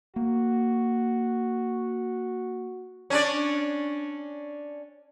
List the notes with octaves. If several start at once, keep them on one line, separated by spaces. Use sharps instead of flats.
A#3 F#4
C#4 D4 D5